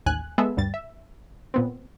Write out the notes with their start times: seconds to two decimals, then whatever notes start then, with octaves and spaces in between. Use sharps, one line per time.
0.06 A1 D#2 G#5 F#6
0.38 G#3 B3 G#4 A4 E5
0.57 D2 G2 G3 A6
0.74 E5
1.54 A#2 B3 C4